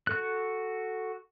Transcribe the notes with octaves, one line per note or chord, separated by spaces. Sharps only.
F#4 A4 F#6